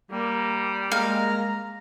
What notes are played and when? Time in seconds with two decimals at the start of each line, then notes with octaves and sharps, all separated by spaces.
0.11 G3 A#3
0.92 G#3 A#3 F5 A#5